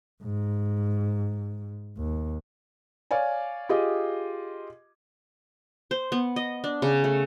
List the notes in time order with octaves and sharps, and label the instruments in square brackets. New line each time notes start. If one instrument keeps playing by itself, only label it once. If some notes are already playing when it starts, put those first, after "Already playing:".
[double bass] G#2
D#2
[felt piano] C#5 D5 F5 G#5
F4 G4 G#4 D#5
[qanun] C5
B3
D#5
D4
C#3
A3